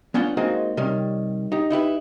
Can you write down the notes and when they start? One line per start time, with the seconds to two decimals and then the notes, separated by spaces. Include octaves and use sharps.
0.14 B3 C#4 D4 F4 F#5 G5
0.37 G#3 A#3 C4 D#4 F#4 G#4
0.77 C3 D#3 G3 C#4
1.52 D#4 G4
1.70 D#4 E4 G4 B4